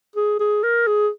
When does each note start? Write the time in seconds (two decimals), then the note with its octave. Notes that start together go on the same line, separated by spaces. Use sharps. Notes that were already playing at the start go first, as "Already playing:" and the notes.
0.16 G#4
0.40 G#4
0.63 A#4
0.87 G#4